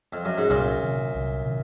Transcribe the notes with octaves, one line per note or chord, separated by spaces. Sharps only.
F2
F#2
G#2
C2 F#2 A#2
C3 D#3 F#3
C2
C3 D#3